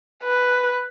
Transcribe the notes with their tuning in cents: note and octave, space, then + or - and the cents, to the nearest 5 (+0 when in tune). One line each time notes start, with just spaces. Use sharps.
B4 +5